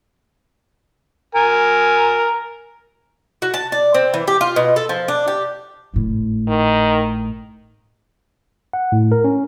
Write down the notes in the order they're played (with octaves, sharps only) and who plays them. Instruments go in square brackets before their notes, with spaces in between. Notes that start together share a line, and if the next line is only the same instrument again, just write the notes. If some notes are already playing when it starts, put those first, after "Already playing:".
[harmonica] A#4 G#5
[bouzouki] F#4
A5
D5
C4
E3
G4
F4
B2
A4
F3
D4
G4
[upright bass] G#1 A2
[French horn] D#3
[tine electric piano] F#5
A2
A#4
C#4